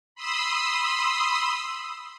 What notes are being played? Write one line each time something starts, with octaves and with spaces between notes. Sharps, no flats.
B5 C6 D#6 E6